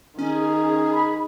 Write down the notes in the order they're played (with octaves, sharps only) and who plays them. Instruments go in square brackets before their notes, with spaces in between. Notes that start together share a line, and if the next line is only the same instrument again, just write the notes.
[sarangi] D#3 [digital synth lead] C#4 [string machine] G#4
[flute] B5